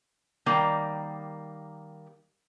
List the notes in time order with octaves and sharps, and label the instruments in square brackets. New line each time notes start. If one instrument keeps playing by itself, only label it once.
[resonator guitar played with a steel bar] D#3 G3 A#3